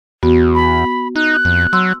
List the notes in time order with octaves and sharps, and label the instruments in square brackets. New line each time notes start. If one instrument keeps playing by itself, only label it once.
[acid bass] E2 [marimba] B3 F#4
[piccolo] B5
[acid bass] D#4 [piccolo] F#6
[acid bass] F2
[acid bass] F#3 [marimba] C6 E6